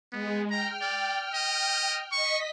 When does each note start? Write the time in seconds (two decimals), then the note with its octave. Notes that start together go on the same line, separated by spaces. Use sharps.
0.12 G#3 B3
0.50 G5 A#5 F6
0.81 D5
1.34 D#5
2.12 D#5 C#6 B6